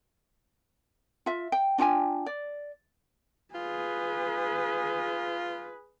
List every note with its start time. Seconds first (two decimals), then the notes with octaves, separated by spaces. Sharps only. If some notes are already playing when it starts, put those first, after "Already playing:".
1.26 F4 E5
1.52 G5
1.78 D4 F4 G5 G#5
2.26 D5
3.55 F4 G#4 B4